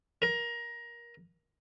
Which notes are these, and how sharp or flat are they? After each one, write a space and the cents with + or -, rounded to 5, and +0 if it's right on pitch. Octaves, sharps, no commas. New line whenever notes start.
A#4 +20